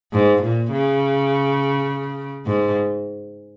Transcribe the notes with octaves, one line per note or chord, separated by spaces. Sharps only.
G#2
A#2
C#3
G#2